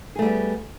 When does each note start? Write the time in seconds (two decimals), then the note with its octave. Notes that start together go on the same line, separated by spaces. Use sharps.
0.16 G#4
0.19 A3
0.22 G3
0.25 B3